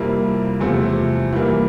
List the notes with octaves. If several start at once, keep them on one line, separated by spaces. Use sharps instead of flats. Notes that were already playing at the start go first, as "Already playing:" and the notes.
Already playing: F2 C3 G3 A#3 E4
E2 C3 F3 A3 C4
E3 G3 A#3